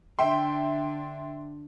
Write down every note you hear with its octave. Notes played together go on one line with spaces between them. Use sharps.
D3 D4 E5 G5 C6